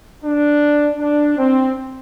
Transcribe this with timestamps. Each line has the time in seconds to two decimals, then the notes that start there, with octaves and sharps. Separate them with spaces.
0.24 D4
1.00 D4
1.38 C4